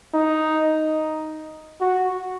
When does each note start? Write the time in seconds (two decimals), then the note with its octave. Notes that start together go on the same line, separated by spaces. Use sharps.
0.14 D#4
1.81 F#4